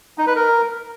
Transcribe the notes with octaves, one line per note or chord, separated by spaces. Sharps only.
D#4
B4
A#4